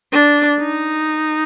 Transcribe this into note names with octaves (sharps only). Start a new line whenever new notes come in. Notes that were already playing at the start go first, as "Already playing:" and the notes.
D4
D#4